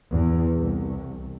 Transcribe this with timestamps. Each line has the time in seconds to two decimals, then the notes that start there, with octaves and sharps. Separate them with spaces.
0.14 E2
0.58 C2